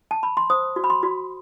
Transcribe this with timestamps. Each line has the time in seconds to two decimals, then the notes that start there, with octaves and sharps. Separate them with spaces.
0.11 A5
0.23 B5
0.37 C6
0.50 C5 D#6
0.76 F#4
0.84 B5
0.90 C6
1.03 F#4